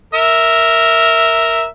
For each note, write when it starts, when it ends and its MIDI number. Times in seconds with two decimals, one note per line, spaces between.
0.14 1.65 70
0.14 1.65 76